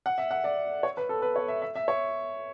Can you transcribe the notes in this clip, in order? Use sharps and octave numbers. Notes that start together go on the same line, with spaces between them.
F#5
E5
F#5
D5
C#5
B4
A4
B4
C#5
E5
E5
E5
C#5